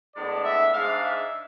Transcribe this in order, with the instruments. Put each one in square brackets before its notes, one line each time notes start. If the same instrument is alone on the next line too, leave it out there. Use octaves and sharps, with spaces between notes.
[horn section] A2 G#3 B3 D4 D5
E5
G#2 G#3 D4 F5
E5